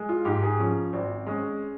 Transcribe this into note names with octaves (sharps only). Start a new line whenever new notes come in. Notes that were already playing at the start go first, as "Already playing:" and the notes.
Already playing: G#3
F4
G#2 G4
G#4
F3 C#4
G#1 C4
G#3 C#4